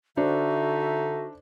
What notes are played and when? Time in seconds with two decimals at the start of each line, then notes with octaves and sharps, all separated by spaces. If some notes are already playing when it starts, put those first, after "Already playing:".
0.17 D3 D4 D#4 F#4 A4 C5 E5